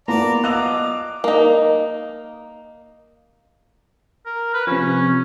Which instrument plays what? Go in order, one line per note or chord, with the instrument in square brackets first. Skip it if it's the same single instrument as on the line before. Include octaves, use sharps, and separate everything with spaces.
[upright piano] A#3 B3 [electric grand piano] F4 [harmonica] D5 A5 [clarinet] A#5
[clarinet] B3 [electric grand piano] D#5 F5 F#6 [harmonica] D6 [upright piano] E6 F7
[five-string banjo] A#3 D#4
[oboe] A#4
B4
[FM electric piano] C3 F3 [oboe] C#4